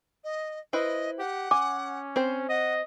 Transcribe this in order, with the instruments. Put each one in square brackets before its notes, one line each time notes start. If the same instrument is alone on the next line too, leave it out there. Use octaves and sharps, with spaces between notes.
[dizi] D#5
[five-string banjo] E4 B4 C5 [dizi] D#5
[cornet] G4 [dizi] F#5
[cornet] C#4 [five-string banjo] G#5 [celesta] D6
[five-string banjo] C4 C5
[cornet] D#5 [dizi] F#5